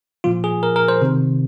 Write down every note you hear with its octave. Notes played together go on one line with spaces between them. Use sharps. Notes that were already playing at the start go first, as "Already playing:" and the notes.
A#2 F3 F4
G#4
A#4
A#4
C5
C3 D#3